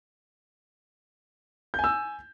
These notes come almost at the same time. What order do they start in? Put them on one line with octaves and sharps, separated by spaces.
G6 G#5 E6